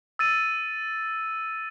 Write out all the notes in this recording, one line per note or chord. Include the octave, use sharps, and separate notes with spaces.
E6 A6 D#7